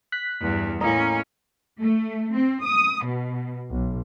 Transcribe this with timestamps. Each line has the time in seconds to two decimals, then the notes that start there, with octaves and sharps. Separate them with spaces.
0.12 F#6 B6
0.41 E2 G2
0.81 A2 A#3 C#4 D#5 A#5
1.81 A3
2.34 C4
2.64 D#6
3.06 B2
3.68 B1